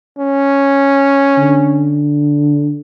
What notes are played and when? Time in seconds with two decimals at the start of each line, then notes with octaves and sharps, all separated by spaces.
0.18 C#4
1.38 D3